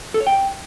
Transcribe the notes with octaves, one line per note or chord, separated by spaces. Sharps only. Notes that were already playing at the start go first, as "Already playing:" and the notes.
A4
C#5
G5